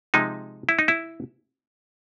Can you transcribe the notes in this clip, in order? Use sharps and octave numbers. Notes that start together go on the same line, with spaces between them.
C3 F3 G#3 D#4
E4
D#4
E4